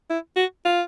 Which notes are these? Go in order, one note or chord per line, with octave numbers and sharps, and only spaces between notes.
E4
F#4
F4